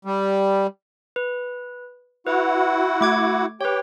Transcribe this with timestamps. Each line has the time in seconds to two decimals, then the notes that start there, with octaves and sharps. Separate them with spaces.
0.05 G3
1.16 B4
2.27 E4 F#4 B4 F#5
3.01 A3 D6 G#6
3.61 G4 B4 C#5 G5